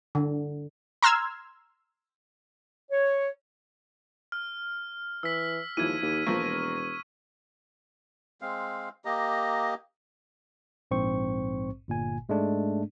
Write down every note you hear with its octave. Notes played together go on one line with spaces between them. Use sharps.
D3
A#5 C6 E6 F6 G#6
C#5
F6
E3 E6 B6
D#2 E3 F3 G#6 D#7
D#2
E1 F3 A#3 C#6
G#3 C4 F5
A#3 G4 D#5 A#5
A#1 G#2 C4 C5 C#6
G1 A#2 G#5
G#2 G#3 A3 D4